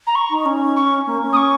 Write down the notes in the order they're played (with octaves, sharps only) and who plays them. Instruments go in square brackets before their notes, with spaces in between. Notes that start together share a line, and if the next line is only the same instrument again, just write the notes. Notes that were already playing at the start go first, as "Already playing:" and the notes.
[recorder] A#5
C#6
[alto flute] D#4
C#4
[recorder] C#6
[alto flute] A#3
C#4
[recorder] D#6
C#6